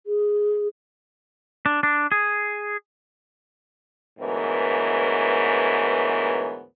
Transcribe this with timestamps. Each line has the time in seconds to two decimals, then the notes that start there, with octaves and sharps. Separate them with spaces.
0.07 G#4
1.66 D4
1.83 D4
2.12 G#4
4.19 D2 G#2 E3 B3 A#4 C#5